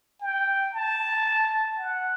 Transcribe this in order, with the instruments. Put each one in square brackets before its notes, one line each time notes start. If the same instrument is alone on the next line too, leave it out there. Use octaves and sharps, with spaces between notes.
[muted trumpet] G5
A5
F#5